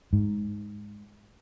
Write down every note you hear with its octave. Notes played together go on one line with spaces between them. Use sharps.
G#2